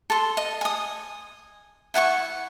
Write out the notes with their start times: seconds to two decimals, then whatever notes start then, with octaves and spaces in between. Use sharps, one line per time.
0.10 A4 C6
0.37 D#5
0.61 G#5 D#6
1.94 E4 F#5 G#5 C#6